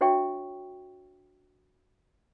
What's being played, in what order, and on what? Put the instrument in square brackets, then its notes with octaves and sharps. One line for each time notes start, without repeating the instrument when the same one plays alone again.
[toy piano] D4 F#4 C#5 E5 G5 C#6